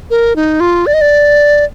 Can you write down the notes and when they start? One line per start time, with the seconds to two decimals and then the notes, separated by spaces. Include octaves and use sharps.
0.10 A#4
0.36 D#4
0.60 F4
0.86 D5
0.94 D#5
1.01 D5